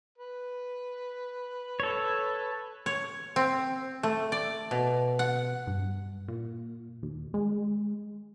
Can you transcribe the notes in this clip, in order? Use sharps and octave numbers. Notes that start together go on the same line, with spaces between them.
B4
A4 C#5
C#5
C4
A3
D5
B2
F#5
G2
A#2
D#2
G#3